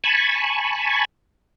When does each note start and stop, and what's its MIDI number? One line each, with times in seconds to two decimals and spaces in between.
0.04 1.05 80
0.04 1.05 81
0.04 1.05 83
0.04 1.05 85